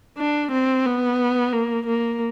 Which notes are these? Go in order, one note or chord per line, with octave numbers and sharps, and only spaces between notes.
D4
C4
B3
A#3
A#3